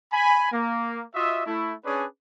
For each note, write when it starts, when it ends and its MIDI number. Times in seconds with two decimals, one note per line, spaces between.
0.12 0.52 80
0.12 0.52 83
0.52 1.04 58
1.15 1.42 65
1.15 1.42 66
1.15 1.42 75
1.15 1.42 76
1.46 1.74 57
1.46 1.74 64
1.85 2.06 61
1.85 2.06 62
1.85 2.06 68
1.85 2.06 71
1.85 2.06 73
1.85 2.06 74